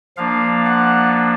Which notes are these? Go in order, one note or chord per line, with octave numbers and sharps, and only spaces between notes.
F3 A#3 D4 F5
F#5